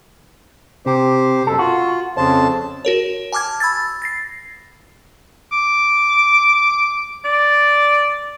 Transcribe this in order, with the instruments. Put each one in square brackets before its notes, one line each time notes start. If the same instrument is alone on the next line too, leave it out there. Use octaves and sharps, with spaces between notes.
[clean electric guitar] C3 [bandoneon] G4 C5
[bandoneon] F#2 B2 [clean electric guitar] A4
[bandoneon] F4 [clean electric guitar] F#4
[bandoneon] F2 C#3 A5 [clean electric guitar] C5
[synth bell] F#4 A#4 C#5
G#5 A5 D6 F6 G#6
B5 E6 G#6 A6
A6 A#6 C7
[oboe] D6
D5